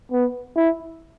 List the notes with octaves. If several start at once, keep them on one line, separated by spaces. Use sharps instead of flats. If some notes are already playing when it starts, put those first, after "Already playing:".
B3
E4